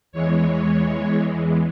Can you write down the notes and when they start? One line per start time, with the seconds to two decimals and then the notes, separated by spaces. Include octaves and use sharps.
0.12 E2 E3 G#3 C#5